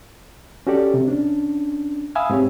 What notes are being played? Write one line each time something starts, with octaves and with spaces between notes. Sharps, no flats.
C#4 F#4 G4 A4 D5
C3
C#4 D4
E5 F5 G#5 B5 D#6 E6
G#2 C4 G4 C#5